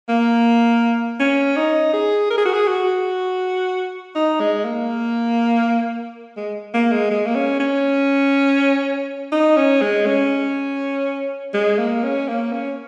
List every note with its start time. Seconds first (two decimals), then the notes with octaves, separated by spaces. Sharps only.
0.09 A#3
1.20 C#4
1.57 D#4
1.94 G#4
2.31 A#4
2.38 G#4
2.45 F#4
2.53 G#4
2.68 F#4
4.15 D#4
4.40 G#3
4.65 A#3
6.37 G#3
6.74 A#3
6.92 G#3
7.11 G#3
7.26 A#3
7.35 C#4
7.60 C#4
9.32 D#4
9.57 C#4
9.82 G#3
10.06 C#4
11.54 G#3
11.79 A#3
12.03 C#4
12.28 A#3
12.52 C#4